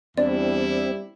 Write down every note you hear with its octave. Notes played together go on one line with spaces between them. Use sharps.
E2 G3 C4 D4 E4 D5